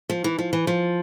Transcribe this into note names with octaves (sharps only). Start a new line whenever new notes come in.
F3
E3
F3
E3
F3